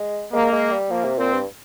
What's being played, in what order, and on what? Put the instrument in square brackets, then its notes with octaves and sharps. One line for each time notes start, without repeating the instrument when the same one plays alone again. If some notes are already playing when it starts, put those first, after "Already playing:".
Already playing: [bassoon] G#3
[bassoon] G#3 [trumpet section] A#3
[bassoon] G#3
G3
[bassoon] F3 [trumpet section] A#3
[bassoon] C3
[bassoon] A#2 [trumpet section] C4
[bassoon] G2